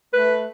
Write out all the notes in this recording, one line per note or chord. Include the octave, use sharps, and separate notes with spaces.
A3 B4